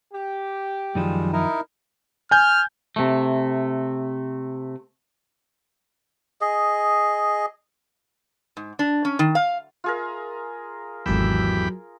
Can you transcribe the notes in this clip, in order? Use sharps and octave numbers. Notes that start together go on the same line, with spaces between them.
G4
F#2 D#3 F3 G3 G#3
D#4 E4 A#4
G#5 F6 G6
C3 A3
G#4 D#5
G#2
D4
C#4
D#3
F5
F4 G#4 A#4
G#1 E2 F#3 G4 A4 B5 E6